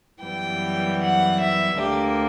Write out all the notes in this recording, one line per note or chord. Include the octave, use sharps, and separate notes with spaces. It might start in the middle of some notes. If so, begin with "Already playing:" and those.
F#2 E3 G3 B3 G5
F#5
E5
D2 D3 A#3 G4